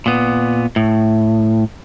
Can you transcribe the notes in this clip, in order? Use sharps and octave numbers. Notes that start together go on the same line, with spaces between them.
A#2 B3
A2